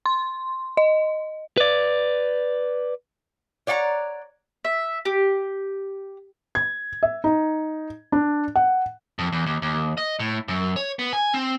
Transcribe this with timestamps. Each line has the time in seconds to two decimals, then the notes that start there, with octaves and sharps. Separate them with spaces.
0.06 C6
0.77 D#5
1.57 B4 D5
3.67 C#5 D5 F#5 G5 A#5
4.65 E5
5.05 G4
6.55 G#6
7.03 E5
7.24 D#4
8.12 D4
8.56 F#5
9.19 F2
9.32 E2
9.46 D#2
9.62 D#2
9.97 D#5
10.19 A2
10.48 F#2
10.76 C#5
10.99 B3
11.13 G#5
11.33 C4